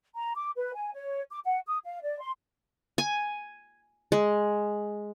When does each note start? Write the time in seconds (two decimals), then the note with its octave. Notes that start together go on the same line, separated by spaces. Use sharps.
0.15 A#5
0.36 D6
0.56 B4
0.75 G#5
0.94 C#5
1.31 D6
1.45 F#5
1.67 D#6
1.84 F5
2.03 D5
2.20 C6
2.98 G#5
4.12 G#3